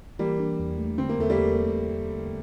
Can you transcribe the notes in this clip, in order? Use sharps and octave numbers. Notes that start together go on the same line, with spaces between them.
E3 G3 A#3
D4
E2
A3
D3 C4
A#3
E2 A3
G3 A#3
E2
A3